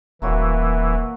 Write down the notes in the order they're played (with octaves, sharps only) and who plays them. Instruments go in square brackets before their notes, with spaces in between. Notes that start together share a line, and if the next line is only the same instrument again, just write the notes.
[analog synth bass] D#1 [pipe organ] E3 [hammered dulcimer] A#3 F#4 C#5